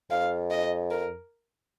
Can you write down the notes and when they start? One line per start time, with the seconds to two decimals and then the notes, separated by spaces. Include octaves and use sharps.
0.11 F2 F5
0.51 D#5
0.91 A#4